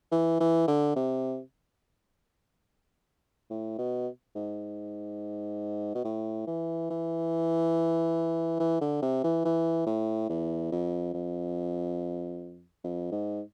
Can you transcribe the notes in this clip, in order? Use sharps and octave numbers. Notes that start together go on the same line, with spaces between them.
E3
E3
D3
C3
A2
B2
G#2
B2
A2
E3
E3
E3
D3
C3
E3
E3
A2
E2
F2
F2
F2
G#2